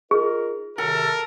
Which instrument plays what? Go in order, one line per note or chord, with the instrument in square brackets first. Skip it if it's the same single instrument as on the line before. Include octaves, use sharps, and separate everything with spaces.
[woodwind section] D#4 F4 A#4 [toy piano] G#4
[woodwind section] F#2 C3 D#3 [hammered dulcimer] A4 [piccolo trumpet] A#4